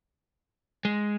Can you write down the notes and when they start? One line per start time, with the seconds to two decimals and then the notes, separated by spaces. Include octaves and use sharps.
0.85 G#3